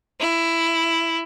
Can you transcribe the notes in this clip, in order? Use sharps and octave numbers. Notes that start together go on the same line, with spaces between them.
E4